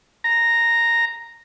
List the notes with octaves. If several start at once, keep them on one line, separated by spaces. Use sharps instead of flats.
A#5